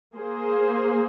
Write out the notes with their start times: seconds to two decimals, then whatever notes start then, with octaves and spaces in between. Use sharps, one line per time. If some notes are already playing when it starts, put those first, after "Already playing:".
0.16 A#3 G#4 C5